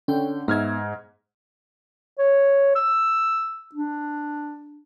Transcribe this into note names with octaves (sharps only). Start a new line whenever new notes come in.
D3 C#4 G5
G#2 B3 E5 F6 G#6
C#5
E6
D4